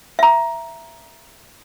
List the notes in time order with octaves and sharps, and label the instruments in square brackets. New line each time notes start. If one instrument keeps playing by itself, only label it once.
[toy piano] E5 A#5